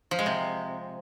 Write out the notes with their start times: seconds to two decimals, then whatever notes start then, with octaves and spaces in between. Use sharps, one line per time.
0.11 F3
0.19 G#3
0.26 C3